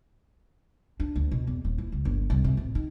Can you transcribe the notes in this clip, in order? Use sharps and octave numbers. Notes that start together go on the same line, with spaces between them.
D4
D2
B2
E2
D#1
E4
C#2
G1
C2
C3
A1
D#3